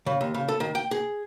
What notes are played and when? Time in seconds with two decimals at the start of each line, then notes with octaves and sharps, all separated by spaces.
0.06 C#3
0.21 D#2
0.34 C#3
0.48 A4
0.60 D#3
0.75 G5
0.91 G#4